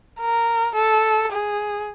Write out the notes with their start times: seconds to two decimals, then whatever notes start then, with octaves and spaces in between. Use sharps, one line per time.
0.20 A#4
0.75 A4
1.32 G#4